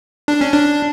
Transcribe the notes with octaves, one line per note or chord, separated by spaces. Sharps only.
D4
C#4
D4